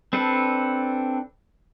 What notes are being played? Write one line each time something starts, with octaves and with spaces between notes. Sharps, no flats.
C4 D4 A4 B4